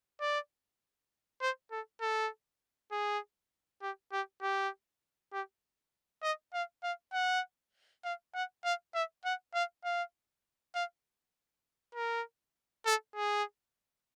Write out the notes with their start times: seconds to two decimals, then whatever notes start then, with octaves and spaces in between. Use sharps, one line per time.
0.21 D5
1.41 C5
1.71 A4
2.01 A4
2.91 G#4
3.82 G4
4.12 G4
4.42 G4
5.32 G4
6.23 D#5
6.53 F5
6.83 F5
7.13 F#5
8.04 F5
8.34 F#5
8.64 F5
8.94 E5
9.25 F#5
9.54 F5
9.84 F5
10.75 F5
11.94 A#4
12.86 A4
13.16 G#4